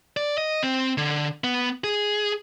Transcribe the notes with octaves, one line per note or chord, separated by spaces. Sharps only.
D5
D#5
C4
D3
B3
G#4